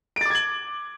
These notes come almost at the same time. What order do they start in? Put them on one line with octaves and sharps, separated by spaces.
D7 A6 D6 G#6 F#7